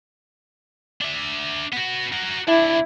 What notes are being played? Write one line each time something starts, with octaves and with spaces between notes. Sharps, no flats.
D4 E5
B3 F#4
F#4 A#4
C2 D4 E4